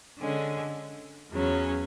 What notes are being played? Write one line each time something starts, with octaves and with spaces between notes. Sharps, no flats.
D3 G#3 C#4
E2 C#3 F#3 C#4